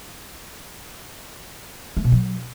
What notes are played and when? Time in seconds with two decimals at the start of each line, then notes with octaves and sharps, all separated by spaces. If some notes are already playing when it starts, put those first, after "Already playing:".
1.97 A3
2.04 B2
2.12 F#3